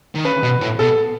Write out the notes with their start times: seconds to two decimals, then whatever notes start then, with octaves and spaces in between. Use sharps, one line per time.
0.15 D#3
0.25 C#3 B4
0.43 B2
0.61 A2
0.79 B2 A4